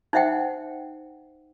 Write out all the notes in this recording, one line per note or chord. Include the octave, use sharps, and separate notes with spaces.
D#4 C5 E5 F#5 G5